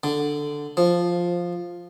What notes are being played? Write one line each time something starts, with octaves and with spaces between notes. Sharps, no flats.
D3
F3